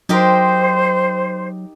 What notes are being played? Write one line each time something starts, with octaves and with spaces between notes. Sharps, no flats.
F#3 D#4 G4 A#4 C5